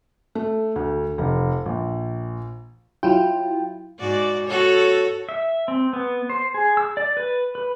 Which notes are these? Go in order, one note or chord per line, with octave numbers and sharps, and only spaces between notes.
A3
D2
F1
A#1
F#3 E4 F4 G5
G#2 F#4 D5
F#4 A4 C#5
E5
C4
B3
C5
G#4
E6
D5
B4
B4